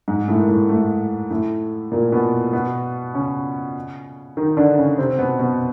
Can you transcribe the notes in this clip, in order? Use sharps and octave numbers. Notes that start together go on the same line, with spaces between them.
G#2 G#3
A2 A3
A#3
A2 A3
A2 A3
A2 A3
A#2 A#3
B2 B3
B2 B3
C#3 C#4
D#3 D#4
D3 D4
C#3 C#4
C3 C4
B2 B3
B2 B3